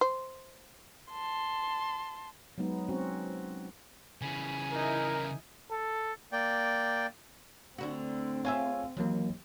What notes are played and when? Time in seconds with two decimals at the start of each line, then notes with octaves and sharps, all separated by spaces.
0.01 C5
1.12 A5 C6
2.58 F#3 G#3 B3 D#4
2.89 C4 C#4 F#4
4.22 C#3 E3 G#5 B5
4.72 D#4 E4 A#4
5.71 A4
6.32 A#3 D5 G5
7.78 D2 D3 C4 F#4
8.45 F4 G#4 C#5 E5 G#5
8.97 D#2 E3 F#3 A#3